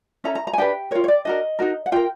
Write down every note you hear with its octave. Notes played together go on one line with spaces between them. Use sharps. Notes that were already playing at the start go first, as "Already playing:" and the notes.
C#4 E4 A4 A#5
A#5
A#5
G#5
D4 G4 B4 G5
F4 A#4 C#5
C#5
D5
D4 F#4 A#4 D#5
D#4 F#4 A#4
F#5
F4 A#4 G5